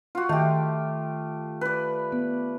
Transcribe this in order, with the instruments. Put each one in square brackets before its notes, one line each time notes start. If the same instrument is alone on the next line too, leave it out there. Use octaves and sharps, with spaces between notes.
[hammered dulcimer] F4 F#4
[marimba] D#3 [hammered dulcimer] A3 G4
[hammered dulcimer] B4 D5
[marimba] B3